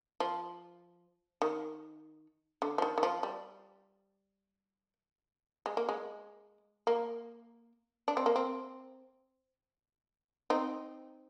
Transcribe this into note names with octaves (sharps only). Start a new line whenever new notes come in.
F3
D#3
D3
F3
D#3
D#3
F3
G3
G#3
A#3
G#3
A#3
D4
C4
A#3
C4
C4 D#4